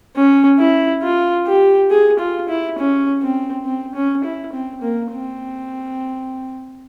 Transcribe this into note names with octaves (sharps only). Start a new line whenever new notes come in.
C#4
E4
F4
G4
G#4
F4
E4
C#4
C4
C4
C#4
E4
C4
A#3
C4